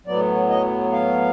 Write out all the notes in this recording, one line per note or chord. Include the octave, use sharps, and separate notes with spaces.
A2 F#3 B3 D5
D#5
F5